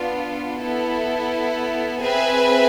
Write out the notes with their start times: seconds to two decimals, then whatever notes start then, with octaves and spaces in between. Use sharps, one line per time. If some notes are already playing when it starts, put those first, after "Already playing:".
Already playing: B3 D4 F4
0.62 B3 E4 A4
2.03 C4 G#4 B4 E5 G#5